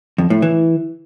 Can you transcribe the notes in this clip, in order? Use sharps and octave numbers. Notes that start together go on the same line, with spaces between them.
F2
A2
E3